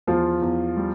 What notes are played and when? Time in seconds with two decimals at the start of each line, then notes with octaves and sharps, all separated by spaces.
0.07 E2 F3 F4
0.42 E2
0.77 G3